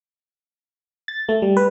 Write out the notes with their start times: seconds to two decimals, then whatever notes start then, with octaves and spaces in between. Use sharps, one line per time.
1.08 A6
1.29 A3
1.42 G3
1.57 B4